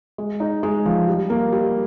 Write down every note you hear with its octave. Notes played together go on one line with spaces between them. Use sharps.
G#3
D#4
G#3
F3
G3
A#3
G3